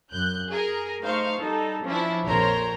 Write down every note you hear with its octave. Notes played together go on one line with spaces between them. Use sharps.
F#2 F#6 G6
G#4 A#4
A3 D#4 C5 F5 C#6
G3 D#4 A4
F3 C#4 D4 E4
A#1 F2 A#4 C5 C#5 A#5